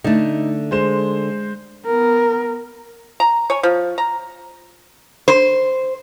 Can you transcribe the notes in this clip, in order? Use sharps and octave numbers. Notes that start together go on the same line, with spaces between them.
D3 A3 D#4
G#3 C5 E7
B3 A#4
A#5
C#5 G#5
F3
A#5
C5